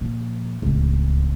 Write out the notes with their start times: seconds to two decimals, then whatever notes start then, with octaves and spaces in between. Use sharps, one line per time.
0.01 A#2 F3
0.62 D1 C#2